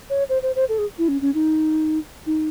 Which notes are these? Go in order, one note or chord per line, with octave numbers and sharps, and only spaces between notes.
C#5
C5
C5
C5
A4
G#4
E4
C#4
C#4
D#4
D#4